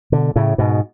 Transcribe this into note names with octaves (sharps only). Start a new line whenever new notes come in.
B2 D3
A2 C#3
G#2 B2